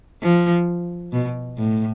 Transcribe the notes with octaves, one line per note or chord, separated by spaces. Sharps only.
F3
B2
A2